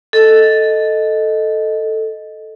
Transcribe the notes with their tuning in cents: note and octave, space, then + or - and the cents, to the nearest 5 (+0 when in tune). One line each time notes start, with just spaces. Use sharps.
A4 +0 D#5 +0